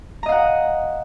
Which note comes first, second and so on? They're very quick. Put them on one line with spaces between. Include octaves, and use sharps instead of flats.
A#5 D#5 F5 F#5